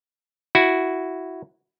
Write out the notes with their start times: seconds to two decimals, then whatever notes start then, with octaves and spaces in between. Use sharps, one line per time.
0.55 E4 F#4